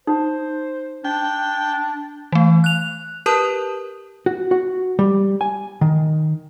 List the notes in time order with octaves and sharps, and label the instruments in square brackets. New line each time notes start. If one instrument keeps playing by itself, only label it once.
[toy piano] D#4 [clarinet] C5
[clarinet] D4 [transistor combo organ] G5
[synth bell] E3 A3
F#6 F7
G4 A#4 B4 A5 D#6
[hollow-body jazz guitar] F#4
F#4
G3
G#5
D#3